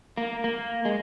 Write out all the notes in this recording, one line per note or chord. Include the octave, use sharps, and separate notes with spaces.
A#3
A#3
G#3